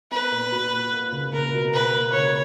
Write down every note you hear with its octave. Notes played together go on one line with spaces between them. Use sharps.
B3 B4
A#2
F#4
A#2
A#3
C#2
C#2 A#4
B2
A#3 B4
A#3
C#2 C#5